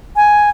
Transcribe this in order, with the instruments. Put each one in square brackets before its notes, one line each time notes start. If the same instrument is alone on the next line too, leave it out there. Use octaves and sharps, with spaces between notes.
[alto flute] G#5